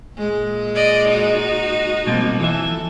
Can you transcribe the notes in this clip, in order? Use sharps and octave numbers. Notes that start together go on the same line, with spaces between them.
A#2 G#3
D5 D#5
D#4 F#4
B2 F3 G3 A#3 C4
E3 A4 E5